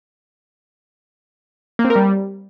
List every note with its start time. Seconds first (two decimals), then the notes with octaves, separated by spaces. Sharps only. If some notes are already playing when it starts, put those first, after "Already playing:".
1.79 A#3
1.85 C4
1.90 A#4
1.96 G3